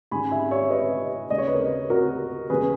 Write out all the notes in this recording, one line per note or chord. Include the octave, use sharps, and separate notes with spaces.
G#2 D#3 G#3 C#4 G#5 B5
E5 G#5
C#5 E5
B4 D#5
D#2 C#3 G#3 D#5
C#5
B4
A#4 C#5
F#4 A#4
E1 D#2 C#3 G#3 B3 G#4 B4